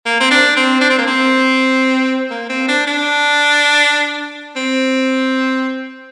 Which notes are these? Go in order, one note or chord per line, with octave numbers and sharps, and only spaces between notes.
A#3
C4
D4
C4
D4
C4
A#3
C4
A#3
C4
D4
D4
C4